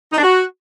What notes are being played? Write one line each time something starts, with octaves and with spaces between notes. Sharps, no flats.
D#4
D4
F#4